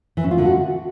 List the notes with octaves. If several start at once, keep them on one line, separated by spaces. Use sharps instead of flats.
E3
C#4
F4
D3
F#4